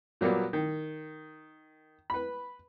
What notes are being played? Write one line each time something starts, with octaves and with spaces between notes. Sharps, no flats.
A#2 F#3 G3 A#3 B3
D#3
B4 B5